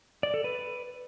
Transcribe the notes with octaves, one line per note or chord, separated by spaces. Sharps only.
D5
A4
B4